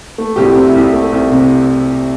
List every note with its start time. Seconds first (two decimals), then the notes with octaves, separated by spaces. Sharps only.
0.18 A3
0.36 C2 G4
0.44 E4
0.56 C3
0.69 E4
0.75 C2
0.93 A3
1.12 C2
1.31 C3